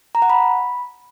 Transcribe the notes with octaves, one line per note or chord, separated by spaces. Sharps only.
A#5
F#5
B5